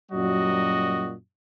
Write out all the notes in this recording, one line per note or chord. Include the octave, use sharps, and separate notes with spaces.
F#2 A#2 F#3 G3 F#4 D#5